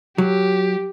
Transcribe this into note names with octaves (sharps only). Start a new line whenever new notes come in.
F#3 G4